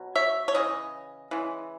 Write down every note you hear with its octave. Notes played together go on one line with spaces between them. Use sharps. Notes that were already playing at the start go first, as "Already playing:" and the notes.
Already playing: B2 F#3
C#5 E5
C#5
C#3 E3 D#5
C#3 E3 G#3